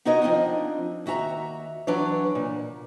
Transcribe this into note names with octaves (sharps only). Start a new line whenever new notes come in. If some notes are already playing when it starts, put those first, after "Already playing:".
B3 D#4 F#4 A#4 C#5 D#5
F3 C4 D4 D#4
D#2 F#4 E5 A5 A#5
E3 F#3 D4 B4 C#5
A#2